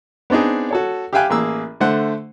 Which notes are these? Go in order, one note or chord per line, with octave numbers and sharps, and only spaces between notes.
B3 C4 D4 D#4 G#4
F#4 A4 C#5
G4 E5 F5 G5 G#5 F#6
A1 A#3 G#4 E6
D3 A3 C5 F#5